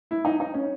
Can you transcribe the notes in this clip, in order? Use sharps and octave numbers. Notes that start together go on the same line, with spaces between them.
E4
D#4
D#4
C#4